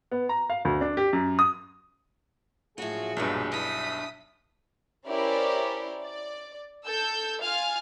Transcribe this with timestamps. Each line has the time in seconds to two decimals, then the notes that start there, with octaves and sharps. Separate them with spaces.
0.12 B3
0.29 A#5
0.50 F5
0.65 D2
0.81 D4
0.97 G4
1.13 F#2
1.39 D#6
2.78 A#1 A2 F#3 F4 F#4 G#4
3.17 B1 G2 A#2 B3 B4
3.52 D4 E4 D#6 B6
5.08 C#4 E4 G4 A#4 C5 D5
6.02 D5
6.85 A4 E6 G6
7.43 F4 F5 G#5 F6